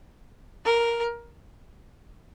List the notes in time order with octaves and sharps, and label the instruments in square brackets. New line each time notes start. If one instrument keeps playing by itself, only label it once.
[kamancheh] A#4